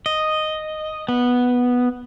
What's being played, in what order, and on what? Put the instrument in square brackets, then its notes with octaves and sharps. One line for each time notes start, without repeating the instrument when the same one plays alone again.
[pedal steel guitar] D#5
B3